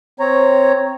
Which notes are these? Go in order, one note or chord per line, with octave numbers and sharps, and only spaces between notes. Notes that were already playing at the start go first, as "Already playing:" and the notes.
C4 C#5 A#5